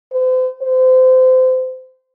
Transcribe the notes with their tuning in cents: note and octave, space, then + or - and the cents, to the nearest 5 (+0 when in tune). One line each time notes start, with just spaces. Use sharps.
C5 -40
C5 -25